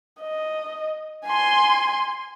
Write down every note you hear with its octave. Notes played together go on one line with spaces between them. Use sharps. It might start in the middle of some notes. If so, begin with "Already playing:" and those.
D#5
G#5 C6